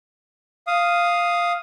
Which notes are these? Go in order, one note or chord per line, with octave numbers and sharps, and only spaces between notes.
F5 D#6